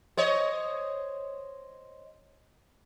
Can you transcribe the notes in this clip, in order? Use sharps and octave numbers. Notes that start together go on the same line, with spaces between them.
C5 C#5 D#5